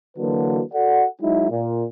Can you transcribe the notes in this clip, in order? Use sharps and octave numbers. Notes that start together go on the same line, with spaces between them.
D3 E3 F#3 A#3 F#4 B4
F#4 A4 D5 F#5
F#3 G#3 D#4 E4
A#2